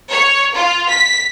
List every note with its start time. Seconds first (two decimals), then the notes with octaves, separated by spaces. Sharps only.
0.10 C#5
0.55 F4
0.89 B6